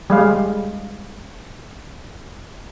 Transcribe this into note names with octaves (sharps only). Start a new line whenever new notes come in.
G3 G#3 F5